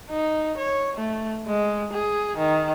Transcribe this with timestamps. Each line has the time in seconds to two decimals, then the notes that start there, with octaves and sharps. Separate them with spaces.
0.10 D#4
0.58 C#5
0.97 A3
1.47 G#3
1.93 G#4
2.38 D#3